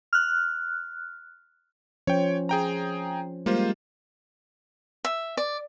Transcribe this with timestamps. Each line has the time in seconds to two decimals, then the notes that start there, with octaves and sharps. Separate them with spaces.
0.13 F6 F#6
2.07 F3 C#4 C5 C#5 G5
2.49 G#4 G5 A#5
3.46 G3 G#3 A#3 F4 G4 C5
5.05 E5
5.37 D5